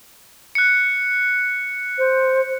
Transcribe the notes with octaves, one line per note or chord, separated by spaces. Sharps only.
F#6 C#7
C5